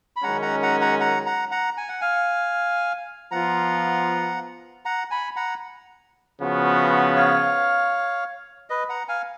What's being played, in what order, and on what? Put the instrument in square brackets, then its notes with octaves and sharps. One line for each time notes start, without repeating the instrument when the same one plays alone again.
[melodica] B5
[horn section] F#2 D#3 G#3 C#4 [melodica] F#5 A#5
[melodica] F#5 A#5
F#5 A#5
F#5 A#5
F#5 A#5
F#5 A#5
F#5 A#5
G#5
F#5
F5 G#5
[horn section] F3 B3 F4 [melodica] F#5 A#5
[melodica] F#5 A#5
G#5 B5
F#5 A#5
[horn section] C#3 F3 B3 F#4
[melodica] C#5 F5
B4 D#5
F#5 A#5
F5 G#5